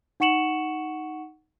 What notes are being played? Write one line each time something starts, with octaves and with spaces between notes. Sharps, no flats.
D#4 F#5 C#6 C#7 E7 F#7